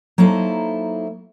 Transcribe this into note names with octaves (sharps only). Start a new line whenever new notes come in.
F#3 A#3 D#4 E4 A4 C5